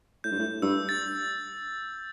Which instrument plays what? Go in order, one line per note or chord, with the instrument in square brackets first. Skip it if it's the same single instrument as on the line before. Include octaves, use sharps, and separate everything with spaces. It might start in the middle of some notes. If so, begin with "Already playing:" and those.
[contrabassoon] A2 [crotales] G6
[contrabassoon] G2
A2
[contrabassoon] G2 [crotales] E6
[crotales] A6